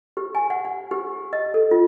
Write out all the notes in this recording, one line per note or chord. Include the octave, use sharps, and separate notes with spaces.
G4
G#5
F#5
F#5
G4
D#5
A4
F4